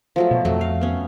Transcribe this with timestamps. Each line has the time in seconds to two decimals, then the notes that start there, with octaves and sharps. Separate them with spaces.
0.16 F3 F#3 A3
0.31 B2
0.45 F2 F#3 A3
0.61 F5
0.81 B3 C#4